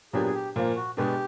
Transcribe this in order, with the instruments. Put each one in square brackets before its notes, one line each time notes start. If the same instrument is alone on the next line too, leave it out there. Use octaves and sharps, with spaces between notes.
[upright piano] A#2 F#3 B3 D4 G4 [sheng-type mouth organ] G#4
[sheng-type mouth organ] G#4
G4
[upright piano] A#2 F3 A#3
[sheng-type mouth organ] F#4
[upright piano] B2 G#3 B3 D4 [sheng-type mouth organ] G4